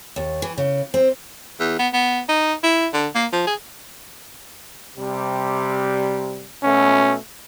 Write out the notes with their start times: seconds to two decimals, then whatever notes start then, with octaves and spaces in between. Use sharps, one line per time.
0.16 D#2
0.42 E3
0.58 C#3
0.94 C4
1.60 E2
1.79 B3
1.93 B3
2.29 D#4
2.64 E4
2.94 D3
3.15 A#3
3.33 F3
3.47 G#4
4.97 C3 G3
6.63 B2 A3 C#4